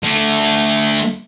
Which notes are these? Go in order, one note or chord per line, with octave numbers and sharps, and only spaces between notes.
D3 A3